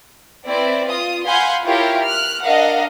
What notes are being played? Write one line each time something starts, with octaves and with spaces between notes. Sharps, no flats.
C4 E4 B4 D5
F4 D#6
F5 F#5 G#5 B5 C6 G6
E4 F4 G4 A#4 C#5 F5
F6 F#6
D4 A#4 D#5 F5 F#5